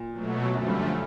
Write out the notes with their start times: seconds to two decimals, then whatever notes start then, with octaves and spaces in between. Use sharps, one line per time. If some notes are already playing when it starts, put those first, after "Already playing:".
Already playing: A#2
0.12 B2 F#3 A3
0.54 F#2 D3 F3 A3
0.68 G2